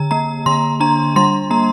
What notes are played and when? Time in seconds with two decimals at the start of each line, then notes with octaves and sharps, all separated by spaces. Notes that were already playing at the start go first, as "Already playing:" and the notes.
Already playing: D3 A#5
0.11 A#3 A#5
0.46 D3 C6
0.80 D4 A#5
1.16 G3 C6
1.50 A#3 A#5